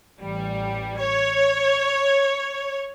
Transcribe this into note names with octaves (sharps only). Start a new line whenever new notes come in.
A1 G3
C#5